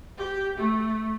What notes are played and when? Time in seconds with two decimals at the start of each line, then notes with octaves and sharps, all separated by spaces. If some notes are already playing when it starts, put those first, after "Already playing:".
0.18 G4
0.57 A3